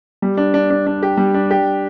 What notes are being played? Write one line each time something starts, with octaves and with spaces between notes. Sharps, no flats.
G3
D4
D4
D4
D4
G4
G3
D4
G4